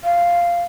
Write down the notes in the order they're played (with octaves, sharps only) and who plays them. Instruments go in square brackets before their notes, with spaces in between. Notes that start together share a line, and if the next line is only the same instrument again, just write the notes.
[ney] F5